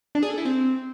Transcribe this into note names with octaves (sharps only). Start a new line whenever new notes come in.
D4
G#4
A4
E4
C4